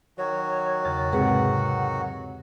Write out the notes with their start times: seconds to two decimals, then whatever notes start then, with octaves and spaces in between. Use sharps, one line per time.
0.18 D#3 F#3 F#4 C#5
0.85 E2 C#3 A6
1.12 G#2 C3 G#4 B4 F#5